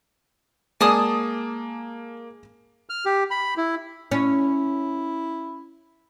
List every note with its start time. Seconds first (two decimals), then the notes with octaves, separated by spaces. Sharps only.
0.81 G#3 A#3 G#4 D5 G#5 A5 D#6
2.90 F6
3.05 G4
3.31 B5
3.57 E4
4.11 C#4 E4